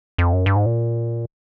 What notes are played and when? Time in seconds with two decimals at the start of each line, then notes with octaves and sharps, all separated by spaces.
0.18 F2
0.33 F#2
0.46 G2
0.56 G#2
0.66 A#2